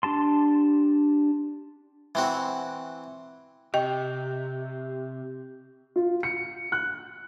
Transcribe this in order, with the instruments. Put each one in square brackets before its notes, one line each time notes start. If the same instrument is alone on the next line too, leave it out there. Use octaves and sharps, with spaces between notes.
[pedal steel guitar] D4 G4 A5 C6
[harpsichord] E3 C4 F#4
[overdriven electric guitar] C3 [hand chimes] G4 G6 [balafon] D#5 G5
[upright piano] F4
C#7
F#6